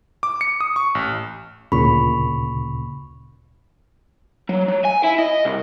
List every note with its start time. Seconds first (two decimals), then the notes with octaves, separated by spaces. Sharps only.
0.23 D6
0.41 C#7
0.61 D#6
0.76 C#6
0.95 A1
1.72 D2 A#2 C#3 B5 C#6
4.49 F#3
4.68 F#3
4.85 G#5
5.04 E4
5.18 D#5
5.45 C2